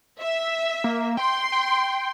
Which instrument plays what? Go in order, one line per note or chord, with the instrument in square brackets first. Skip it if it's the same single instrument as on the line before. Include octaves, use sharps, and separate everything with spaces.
[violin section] E5
[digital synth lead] A#3
[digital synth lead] G5 [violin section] C6
[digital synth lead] G5